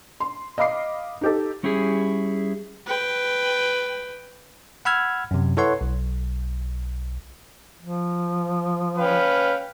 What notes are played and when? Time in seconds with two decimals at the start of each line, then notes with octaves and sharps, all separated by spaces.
0.20 C6
0.58 D#5 F5 B5 D6 C7
1.21 D#4 G4 A4
1.63 G3 C#4 E4 G4 G#4
2.87 B4 G5
4.85 F#5 B5 E6 F6 G#6
5.31 F#2 C3
5.57 E4 A4 B4 C#5 F#5 C6
5.81 B1
7.81 F3
8.98 C#4 B4 F5 G5